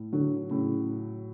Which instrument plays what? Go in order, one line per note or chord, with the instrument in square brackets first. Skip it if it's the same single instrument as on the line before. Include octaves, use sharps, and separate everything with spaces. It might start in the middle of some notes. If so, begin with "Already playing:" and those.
Already playing: [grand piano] A2
[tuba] D3 [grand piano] F#3
[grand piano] A2 [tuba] C#3